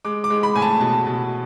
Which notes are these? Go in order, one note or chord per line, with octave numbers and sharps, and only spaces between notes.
G#3 D6
D6
G#3
B5
A2 G#5
A5
B2 A5
B2